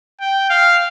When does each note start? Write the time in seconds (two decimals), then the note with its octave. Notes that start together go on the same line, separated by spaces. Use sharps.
0.20 G5
0.50 F5